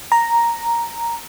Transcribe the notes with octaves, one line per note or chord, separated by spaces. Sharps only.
A#5